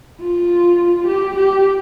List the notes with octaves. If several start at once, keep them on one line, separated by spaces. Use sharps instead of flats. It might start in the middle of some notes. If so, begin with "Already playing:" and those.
F4
G4
G4